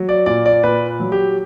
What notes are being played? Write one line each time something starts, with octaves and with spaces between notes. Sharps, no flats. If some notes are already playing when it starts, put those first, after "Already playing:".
Already playing: F#3
D5
A#2 D5
D5
A#2 B4
F#3
G4